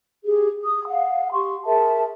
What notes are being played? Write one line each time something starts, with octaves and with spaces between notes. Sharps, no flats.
G4 G#4
D#6
F5 F#5
G4 C6 C#6
G#4 A#4 E5 A5